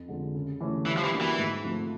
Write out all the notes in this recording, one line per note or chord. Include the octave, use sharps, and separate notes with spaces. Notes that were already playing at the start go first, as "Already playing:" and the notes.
Already playing: F2
D3 F3 G#3
C#3
E3 A3 C#4
E3 G3
F3
E3
A#3 D4 F#4
E3
G#2
F3 A3 C4 F4